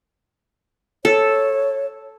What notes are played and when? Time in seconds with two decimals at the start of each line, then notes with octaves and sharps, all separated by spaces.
1.05 A4 C#5